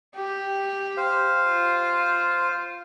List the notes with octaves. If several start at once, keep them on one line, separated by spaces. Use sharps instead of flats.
G4
C5 F5
F4